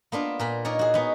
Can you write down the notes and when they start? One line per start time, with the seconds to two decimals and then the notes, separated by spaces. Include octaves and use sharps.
0.12 A#3 B3 D4 F4
0.39 A#2 A#4 B5
0.65 D#4 A#4 C#5 D5
0.79 F#4 G#4
0.94 B3 D#4